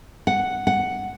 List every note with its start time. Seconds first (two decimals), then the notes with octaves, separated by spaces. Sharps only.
0.27 F#5
0.67 F#5